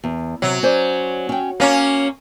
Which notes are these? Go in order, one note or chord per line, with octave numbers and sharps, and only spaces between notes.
E2
C3 F#3
C#4 C5 D5
C#4 G5
A#3 C#4 G#5